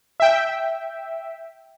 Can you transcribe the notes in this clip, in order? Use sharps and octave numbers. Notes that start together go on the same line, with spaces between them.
E5 G5